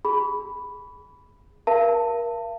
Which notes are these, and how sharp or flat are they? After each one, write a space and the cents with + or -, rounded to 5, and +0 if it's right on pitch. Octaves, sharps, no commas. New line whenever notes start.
G#4 -10 B5 +0
A#4 +25 F5 -45 A5 +25